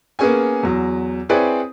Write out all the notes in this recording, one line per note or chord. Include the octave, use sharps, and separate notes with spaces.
A#3 B3 C#4 G#4 C#5 G#5
E2 F#3
C4 E4 G#4 B4 C#5 D5